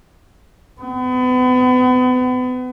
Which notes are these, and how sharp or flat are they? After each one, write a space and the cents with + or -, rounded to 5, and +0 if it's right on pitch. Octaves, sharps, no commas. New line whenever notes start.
B3 +35